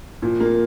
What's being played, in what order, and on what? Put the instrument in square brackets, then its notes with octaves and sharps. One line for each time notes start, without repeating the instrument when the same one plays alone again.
[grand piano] A#2 [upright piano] F3
[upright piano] A#3